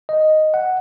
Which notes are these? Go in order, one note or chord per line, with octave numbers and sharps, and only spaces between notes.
D#5
F#5